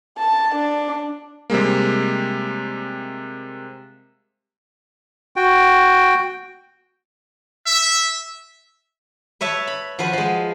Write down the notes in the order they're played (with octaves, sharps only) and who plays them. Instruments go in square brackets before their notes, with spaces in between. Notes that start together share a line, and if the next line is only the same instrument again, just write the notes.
[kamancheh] A5
D4
[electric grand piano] C3 G3 G#3 A#3
[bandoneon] F#4 G5
[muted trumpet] E5
[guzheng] B4 C#5 E5 A5
B5
F3 F#4 B4
F3 G#3